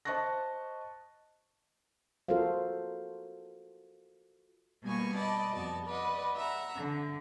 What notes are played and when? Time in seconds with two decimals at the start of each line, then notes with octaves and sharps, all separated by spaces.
0.05 C5 D#5 A5 C#6 F#6 A#6
2.28 F4 F#4 A4 A#4 C5 F5
4.83 B2 G3 A#3 B3 G#5 C#6
5.16 B4 D5 D#5 A5
5.56 F2 B3 F#4 A5
5.87 B4 D5 D#5 F#5
6.35 E5 F#5 A#5
6.78 D3